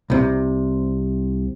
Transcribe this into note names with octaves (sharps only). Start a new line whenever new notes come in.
C2 C3